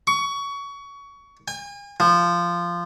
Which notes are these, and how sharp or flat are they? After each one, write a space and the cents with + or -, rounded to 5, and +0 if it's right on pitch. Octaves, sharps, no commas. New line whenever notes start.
C#6 +25
G#5 -40
F3 -10